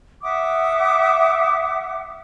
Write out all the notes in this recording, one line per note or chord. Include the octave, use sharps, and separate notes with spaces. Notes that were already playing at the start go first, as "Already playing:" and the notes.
E5 F#5 D6 D#6